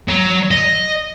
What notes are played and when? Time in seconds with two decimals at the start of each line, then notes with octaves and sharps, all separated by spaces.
0.08 F#3 A#5
0.51 D#5